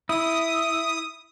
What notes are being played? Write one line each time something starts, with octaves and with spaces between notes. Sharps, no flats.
E4 D#6